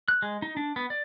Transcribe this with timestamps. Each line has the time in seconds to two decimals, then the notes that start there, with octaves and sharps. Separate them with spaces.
0.08 F#6
0.22 G#3
0.42 D#4
0.57 D4
0.76 B3
0.90 D5